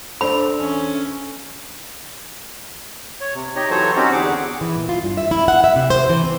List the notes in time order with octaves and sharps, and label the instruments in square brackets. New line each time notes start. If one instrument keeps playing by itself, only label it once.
[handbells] D4 A4 [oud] C5 D5 [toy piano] B5
[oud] E2 [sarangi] C#4
[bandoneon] C#5
C3
D#4 G4 C#5 D#5
E3 F#3 A4 C5 C#5
C4 C#4 D#4 F#4 G4
E2 D3 G#4 F#5 D6
[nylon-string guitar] E3
A#2
F4
G2
E5
E4
F#5
E5
C3
C5
E3
C4